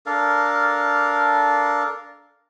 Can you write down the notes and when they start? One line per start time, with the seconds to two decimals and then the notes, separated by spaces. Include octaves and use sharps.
0.06 D4 A4 A#4 F5